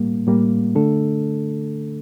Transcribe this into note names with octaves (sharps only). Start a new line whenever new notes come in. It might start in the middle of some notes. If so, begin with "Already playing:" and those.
Already playing: A2 G3 A#3
A2 G3 A#3
D3 A3 D4 A4